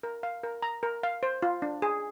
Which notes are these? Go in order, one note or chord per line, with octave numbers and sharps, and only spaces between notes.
A#4
F5
A#4
A#5
A#4
F5
C5
F4
D4
G#4